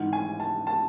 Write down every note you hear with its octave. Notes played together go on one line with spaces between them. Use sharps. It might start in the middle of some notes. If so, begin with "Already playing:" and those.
Already playing: G#1 G#2 E3 F#5
G#5
A5
A5